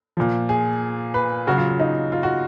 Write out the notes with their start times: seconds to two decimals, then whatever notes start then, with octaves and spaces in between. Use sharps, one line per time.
0.17 A#2 F3
0.49 G#4
1.14 B4
1.47 C#3 F#3 F#4
1.58 F4
1.69 F4
1.80 D#4
2.12 F4
2.23 F#4